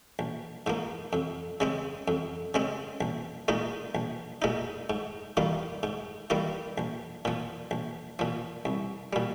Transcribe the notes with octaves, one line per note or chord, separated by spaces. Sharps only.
A#1
G#2 F3 A#3
F2
C#3 G#3 C4
F2
C#3 G#3 C4
A#1
A#2 G#3 D#4
A#1
A#2 G#3 D#4
G#2
D#3 G3 A#3 F4
G#2
D#3 G3 A#3 F4
A#1
A#2 F3
A#1
A#2 F3
C2
A#2 G3